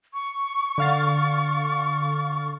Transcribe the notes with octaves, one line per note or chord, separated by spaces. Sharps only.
C#6
D3 F5 A6